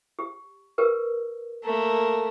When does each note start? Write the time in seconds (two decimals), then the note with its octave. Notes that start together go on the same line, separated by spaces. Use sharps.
0.19 G4
0.78 G4 A#4 B4
1.64 A3 A#3